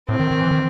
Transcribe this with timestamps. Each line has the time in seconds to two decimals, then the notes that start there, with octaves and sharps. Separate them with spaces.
0.09 A2 C4
0.20 D#3
0.31 D#3
0.40 E3
0.51 D#3